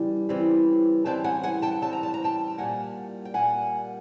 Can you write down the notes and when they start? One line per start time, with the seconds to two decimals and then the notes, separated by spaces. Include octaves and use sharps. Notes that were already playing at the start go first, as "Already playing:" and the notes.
Already playing: C#3 E3 G3
0.29 C#3 E3 G3 C4
1.05 C#3 E3 G3 C4 G5 A5
1.24 F#5 G#5
1.43 F#5 G#5
1.62 G5 A5
1.82 C#3 E3 G3 C4 A5
1.93 A#5
2.03 A5
2.14 A#5
2.24 G5 A5
2.58 A#2 G3 A#3 F#5 G#5
3.25 G5
3.34 A#2 G3 A#3 F#5 G#5